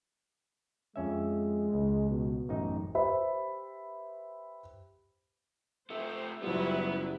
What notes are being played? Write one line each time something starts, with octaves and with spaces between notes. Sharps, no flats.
F2 G#3 C#4 E5
C#2
B2
A1 F#2 D#4
G4 B4 C5 E5 B5
C3 A3 C5 E5
F#1 F#3 G3 B3 E4 F4